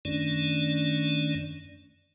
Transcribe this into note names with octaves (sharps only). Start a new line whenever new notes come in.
F#2 D#3 A3 C#4 D4 D5